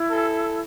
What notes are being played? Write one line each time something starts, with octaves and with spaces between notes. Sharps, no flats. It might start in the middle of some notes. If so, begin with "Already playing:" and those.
Already playing: E4
A4